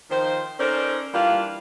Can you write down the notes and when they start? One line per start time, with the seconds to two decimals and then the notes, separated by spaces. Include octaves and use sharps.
0.10 D#3 F3 C5
0.59 C#4 D#4 A4 A#4 C5 D5
1.14 E3 G3 A#3 D4 F4